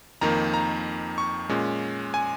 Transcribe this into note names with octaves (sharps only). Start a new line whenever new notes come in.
F2 D#3 A#3 A#5
A#5
C#6
A#2 G#3 C#4
G#5